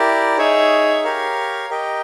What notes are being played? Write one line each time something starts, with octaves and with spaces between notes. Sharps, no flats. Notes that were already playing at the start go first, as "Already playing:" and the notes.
Already playing: E4 G4 A#4 D5
D#4 G#4 C#5 E5
G4 A#4 C#5 F5
G4 A#4 D#5 G5